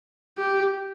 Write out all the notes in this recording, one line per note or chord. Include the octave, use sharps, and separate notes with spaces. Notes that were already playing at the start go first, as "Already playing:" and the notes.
G4